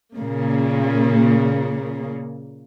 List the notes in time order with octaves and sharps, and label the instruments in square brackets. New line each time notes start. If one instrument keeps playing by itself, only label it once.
[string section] A#2 C#3 A#3